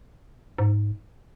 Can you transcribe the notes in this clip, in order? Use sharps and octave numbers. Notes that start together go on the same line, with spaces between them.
G#2